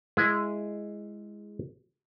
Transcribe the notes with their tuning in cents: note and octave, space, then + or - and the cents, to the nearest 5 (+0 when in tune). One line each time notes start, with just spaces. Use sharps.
G#3 +0 E4 +15 G#4 +0